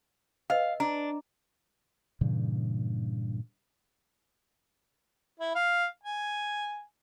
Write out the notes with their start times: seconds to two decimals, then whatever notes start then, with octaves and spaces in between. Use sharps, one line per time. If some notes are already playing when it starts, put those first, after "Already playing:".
0.50 B4 D#5 F5 E6
0.80 D4 A#5
2.21 G2 A#2 C#3 E3
5.40 E4
5.55 F5
6.04 G#5